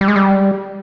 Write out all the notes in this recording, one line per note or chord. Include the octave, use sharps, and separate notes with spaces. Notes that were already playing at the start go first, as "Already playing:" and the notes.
G3
G#3
G3